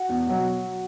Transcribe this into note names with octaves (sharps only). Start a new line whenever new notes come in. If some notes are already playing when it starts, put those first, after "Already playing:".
Already playing: F#4
E2
B2 F#3